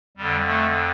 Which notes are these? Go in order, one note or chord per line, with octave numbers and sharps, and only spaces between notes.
F2 D3 G3
A3